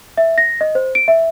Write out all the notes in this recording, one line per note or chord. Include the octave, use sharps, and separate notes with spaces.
E5
A#6
D#5
C5
D7
E5